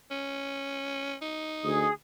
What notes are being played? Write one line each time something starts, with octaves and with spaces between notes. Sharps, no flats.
C#4
D#4
D2 G#4 D#6